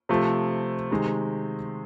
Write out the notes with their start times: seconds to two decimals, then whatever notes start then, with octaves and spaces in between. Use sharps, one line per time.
0.09 C3 F3 A3
0.91 C3 D#3 G#3